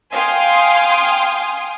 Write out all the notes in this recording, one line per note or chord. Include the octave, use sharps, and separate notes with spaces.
F5 G5 G#5 C6 D#6